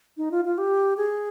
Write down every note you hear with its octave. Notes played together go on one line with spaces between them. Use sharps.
D#4
F4
F4
G4
G#4